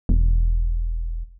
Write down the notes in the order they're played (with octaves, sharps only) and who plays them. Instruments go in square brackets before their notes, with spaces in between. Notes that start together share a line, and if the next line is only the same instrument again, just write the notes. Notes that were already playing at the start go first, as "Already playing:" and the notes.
[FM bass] E1